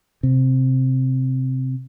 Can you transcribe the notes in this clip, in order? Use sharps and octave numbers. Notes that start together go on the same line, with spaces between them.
C3